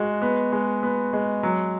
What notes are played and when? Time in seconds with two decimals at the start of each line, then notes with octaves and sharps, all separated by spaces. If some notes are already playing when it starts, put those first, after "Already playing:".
Already playing: G#3 F#4
0.22 B3
0.52 G#3
0.83 B3
1.13 G#3
1.43 F#3